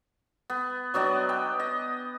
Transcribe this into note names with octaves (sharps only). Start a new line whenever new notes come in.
B3
F#3 B3 D4 D#5
G5
D#5